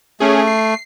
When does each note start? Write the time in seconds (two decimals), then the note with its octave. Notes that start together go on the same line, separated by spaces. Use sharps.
0.20 A3 C#4 G#4
0.47 C7